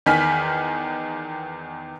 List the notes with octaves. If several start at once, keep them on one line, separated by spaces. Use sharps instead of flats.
E2 D#3 G#5 F6 B6